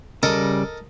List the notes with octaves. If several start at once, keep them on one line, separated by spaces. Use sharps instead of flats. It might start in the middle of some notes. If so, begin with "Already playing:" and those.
C#3 G3 A4 A#4 D#5